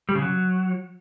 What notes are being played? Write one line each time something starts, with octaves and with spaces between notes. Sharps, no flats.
G3
C#3
F#3